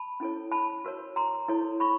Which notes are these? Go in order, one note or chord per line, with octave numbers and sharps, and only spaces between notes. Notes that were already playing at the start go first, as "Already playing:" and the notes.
Already playing: A5 B5
C#4 E4 A4 C#5
A5 B5
F#4 A#4 C#5
A#5 C6
E4 A4 C#5
B5 C#6